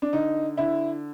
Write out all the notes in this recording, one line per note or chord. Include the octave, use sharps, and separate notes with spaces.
D4
D3 D#4
D3 E4